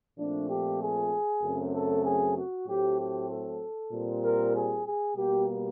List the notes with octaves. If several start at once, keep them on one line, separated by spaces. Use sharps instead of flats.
A#2 F3 A3 C4 D4
G4
G#4
F#2 C#3 F#3 A3 C4
A4
G#4
F#4
A2 F#3 A3 C4 G4
G4
A4
A#2 G3 C4
A#4
G#4
G#4
B2 G3 A#3 G4